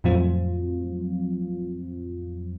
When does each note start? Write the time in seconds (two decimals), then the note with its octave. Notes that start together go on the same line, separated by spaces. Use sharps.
0.04 F2 A2 F3 F#3 C4 F4